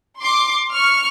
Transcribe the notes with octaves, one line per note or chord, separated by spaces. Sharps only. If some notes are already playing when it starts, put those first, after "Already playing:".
C6 D6
C#6 F6